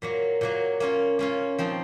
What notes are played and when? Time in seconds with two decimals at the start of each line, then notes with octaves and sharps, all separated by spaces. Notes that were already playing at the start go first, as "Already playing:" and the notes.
0.02 A#2 F#3 A#3
0.41 A#2 F#3 A#3
0.80 A#3 C#4 F4
1.19 A#3 C#4 F4
1.59 F3 C4 D#4